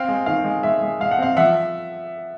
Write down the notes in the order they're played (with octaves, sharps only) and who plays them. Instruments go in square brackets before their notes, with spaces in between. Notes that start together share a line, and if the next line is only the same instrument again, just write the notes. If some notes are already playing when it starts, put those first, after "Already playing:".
Already playing: [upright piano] C4 F5 G5
G#3
D#3 F5
G#3
G#3 E5
G#3
G#3 F5
F#5
C4 F5
F3 E5 F#5